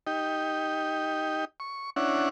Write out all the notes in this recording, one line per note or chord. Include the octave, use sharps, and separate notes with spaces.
D#4 G4
C#6
C#4 D4 E4 F#5